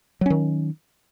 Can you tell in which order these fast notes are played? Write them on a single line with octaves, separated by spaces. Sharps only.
F#3 C#4 D#3